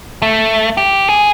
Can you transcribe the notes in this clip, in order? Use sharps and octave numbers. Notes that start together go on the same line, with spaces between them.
A3
G4
G#4